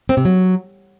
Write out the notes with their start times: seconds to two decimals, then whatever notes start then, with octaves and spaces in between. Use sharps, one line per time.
0.09 C4
0.17 C3
0.25 F#3